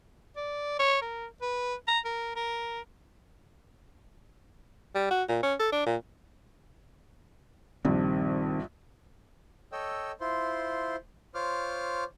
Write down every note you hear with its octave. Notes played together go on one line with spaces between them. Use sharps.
D5
C#5
A#4
B4
A#5
A#4
A#4
G3
F#4
A#2
C#4
A4
D4
A#2
A#1 G2 D#3 C4
A4 C#5 D#5 G5 E6
E4 F4 C5 C6
F4 C5 C#5 D6 F6